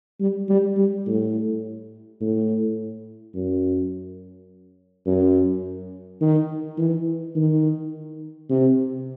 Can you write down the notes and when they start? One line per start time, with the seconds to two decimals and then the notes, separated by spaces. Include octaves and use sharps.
0.20 G3
0.49 G3
0.77 G3
1.06 A2
2.21 A2
3.35 F#2
5.06 F#2
6.21 D#3
6.78 E3
7.36 D#3
8.50 C3